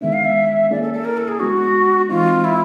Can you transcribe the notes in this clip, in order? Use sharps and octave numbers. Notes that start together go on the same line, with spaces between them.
D#3 G#3 B3 D4 E5
F5
E5
A#3 C#4 E4 G#4 D5
A4
A4
A#4
A4
G#4
G#3 B3 D4 F#4
E3 G#3 C4 D#4 F4
E4